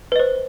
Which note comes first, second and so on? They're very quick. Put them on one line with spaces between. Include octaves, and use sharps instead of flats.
B4 D#5 C5